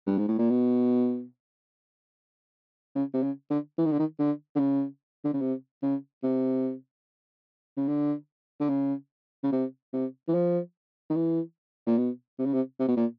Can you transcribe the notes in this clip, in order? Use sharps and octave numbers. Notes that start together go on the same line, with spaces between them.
G2
G#2
A2
A#2
B2
C#3
C3
C#3
D3
E3
D#3
D3
D#3
D3
D3
C#3
D3
C#3
C3
C#3
C3
C#3
D3
D3
C#3
C#3
C3
C3
E3
F3
D#3
E3
A#2
B2
C3
C#3
C3
C3
B2
A#2